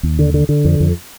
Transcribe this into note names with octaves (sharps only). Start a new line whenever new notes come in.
D#2
D3
D3
D3
F2
F2